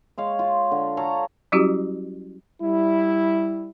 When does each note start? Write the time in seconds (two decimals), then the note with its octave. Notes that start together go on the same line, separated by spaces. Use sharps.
0.18 G#3 C#5 F5
0.39 F4
0.71 D3
0.97 A4 C#5 F5 A#5
1.52 F#3 G3 C#4 E4 F#4 G4
2.61 G3 E4